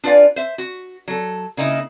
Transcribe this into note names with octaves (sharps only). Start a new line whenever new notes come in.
D4 F4 B4 D5 F5 G#5
C5 E5
F#4
F#3 A4
C#3 A#3 D#4 E4